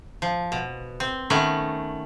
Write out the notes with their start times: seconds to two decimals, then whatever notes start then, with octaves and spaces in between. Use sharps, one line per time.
0.22 F3
0.52 B2
1.00 C4
1.30 D#3 A3 B3 C#4